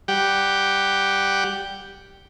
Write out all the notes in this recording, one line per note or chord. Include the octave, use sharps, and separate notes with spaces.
G3 G4 F#5 G5